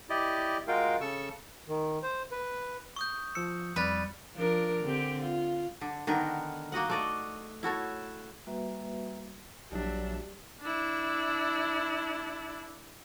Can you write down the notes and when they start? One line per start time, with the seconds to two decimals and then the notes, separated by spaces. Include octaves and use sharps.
0.10 E4 G4 D5 D#5
0.68 G#3 F4 F#4 A#4 F5 G5
1.01 C#3 A4 C#6 E6
1.69 D#3
2.03 C5
2.31 B4
2.96 C#6 D#6 G6
3.35 F3 E6 C#7
3.76 F2 G3 B4 D5 B5 A6
4.35 F3 D4 A#4
4.83 D3 C4 G4
5.22 F4
5.81 D3
6.07 D3 D#3 B3 A#4
6.72 A#3 F#4 D#5 F#5
6.90 A3 D5 D#5
7.63 E4 F#4 A4 C#5
8.47 G3 A#3 F#4 B4 E5
9.72 A#1 F#3 G3 D4 E5
10.62 D4 E4